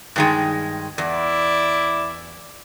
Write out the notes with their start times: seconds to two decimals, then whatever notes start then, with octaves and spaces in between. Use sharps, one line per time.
0.16 G2 D#3 G#3
0.98 E2 E4 D5